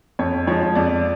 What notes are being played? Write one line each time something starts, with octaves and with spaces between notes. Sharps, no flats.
F2 C#5
F3 G#3 C#5
F2 D5